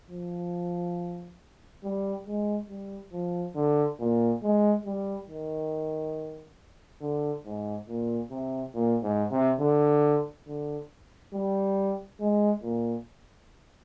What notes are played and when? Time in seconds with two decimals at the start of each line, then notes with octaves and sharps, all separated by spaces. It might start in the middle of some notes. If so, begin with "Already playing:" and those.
0.10 F3
1.83 G3
2.27 G#3
2.69 G3
3.13 F3
3.55 D3
4.00 A#2
4.43 G#3
4.86 G3
5.29 D#3
7.01 D3
7.45 G#2
7.88 A#2
8.31 C3
8.74 A#2
9.03 G#2
9.31 C3
9.60 D3
10.47 D3
11.34 G3
12.20 G#3
12.63 A#2